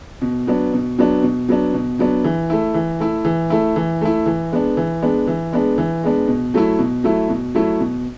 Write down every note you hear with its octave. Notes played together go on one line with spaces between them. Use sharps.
B2
F#3 B3 D4
B2
F#3 B3 D4
B2
F#3 B3 D4
B2
F#3 B3 D4
E3
A3 E4
E3
A3 E4
E3
A3 E4
E3
A3 E4
E3
G#3 B3 D4
E3
G#3 B3 D4
E3
G#3 B3 D4
E3
G#3 B3 D4
B2
F#3 A3 E4
B2
F#3 A3 E4
B2
F#3 A3 E4
B2